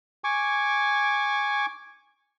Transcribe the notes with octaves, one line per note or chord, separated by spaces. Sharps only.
G#5 C#6 D6